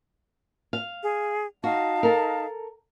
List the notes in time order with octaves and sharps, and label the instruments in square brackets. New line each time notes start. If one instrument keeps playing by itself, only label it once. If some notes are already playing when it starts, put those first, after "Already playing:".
[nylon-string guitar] F5
[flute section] G#4
[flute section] D#4 F5 A5 [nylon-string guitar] F#4
[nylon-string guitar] A4 A#4